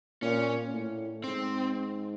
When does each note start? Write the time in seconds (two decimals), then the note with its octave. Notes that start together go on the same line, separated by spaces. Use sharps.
0.22 A#2 C#4
0.72 A2
1.24 G#2 C4